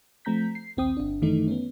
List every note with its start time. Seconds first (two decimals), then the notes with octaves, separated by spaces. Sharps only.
0.25 F3 A3 C4 A#5 G6 B6
0.55 C7
0.77 A#1 D#2 C4 G5 D#6
0.97 G1 D4
1.22 F#2 D#3 E3 A3 D#4
1.48 B3 C#4